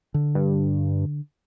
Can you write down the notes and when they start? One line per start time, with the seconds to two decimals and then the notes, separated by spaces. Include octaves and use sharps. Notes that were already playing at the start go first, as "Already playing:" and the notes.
0.14 D3
0.35 G2